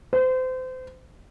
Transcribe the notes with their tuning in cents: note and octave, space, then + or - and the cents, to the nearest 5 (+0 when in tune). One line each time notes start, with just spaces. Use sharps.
C5 -30